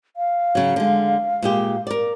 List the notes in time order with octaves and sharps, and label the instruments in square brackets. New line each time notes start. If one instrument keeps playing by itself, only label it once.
[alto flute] F5
[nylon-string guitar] C#3 F#3
D3 G#3
A#2 G#3 G4
A#4 D5